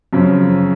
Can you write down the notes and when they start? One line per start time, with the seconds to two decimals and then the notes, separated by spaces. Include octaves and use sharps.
0.13 F#2 C#3 F3